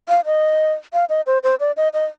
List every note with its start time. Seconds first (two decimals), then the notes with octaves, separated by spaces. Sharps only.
0.09 F5
0.25 D#5
0.93 F5
1.09 D#5
1.27 C5
1.43 C5
1.60 D5
1.77 D#5
1.94 D#5